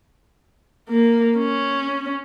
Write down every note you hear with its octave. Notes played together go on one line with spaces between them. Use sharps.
A#3
C#4